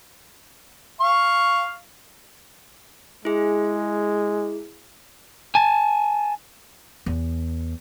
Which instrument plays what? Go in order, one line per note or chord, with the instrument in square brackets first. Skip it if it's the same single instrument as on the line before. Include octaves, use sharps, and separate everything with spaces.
[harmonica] F5 C#6
[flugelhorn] G#3 [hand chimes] E4 G#4
[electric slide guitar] G#5 A5
[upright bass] E2